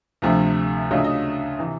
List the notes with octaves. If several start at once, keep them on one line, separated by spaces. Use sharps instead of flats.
D2 C3 F3 A3
C#3 F#3 A3 D4 F4 D#5
E5
D#5
C3 E3